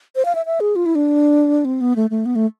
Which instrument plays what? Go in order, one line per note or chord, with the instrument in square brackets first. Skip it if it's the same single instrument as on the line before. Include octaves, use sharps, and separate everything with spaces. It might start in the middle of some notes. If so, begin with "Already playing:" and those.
[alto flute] C5
F5
E5
E5
G#4
F4
E4
D4
C4
B3
A3
A3
B3
A3